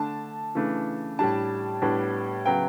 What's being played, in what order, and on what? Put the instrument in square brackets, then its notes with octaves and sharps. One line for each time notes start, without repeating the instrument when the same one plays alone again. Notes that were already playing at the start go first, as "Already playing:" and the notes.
Already playing: [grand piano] D3 A3 D4 A5
C#3 E3 A3 D4
A2 G3 D4 A5
A2 G3 B3 D4
C#3 F#3 B3 G5